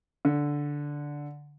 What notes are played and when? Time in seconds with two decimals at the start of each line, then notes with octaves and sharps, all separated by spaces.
0.25 D3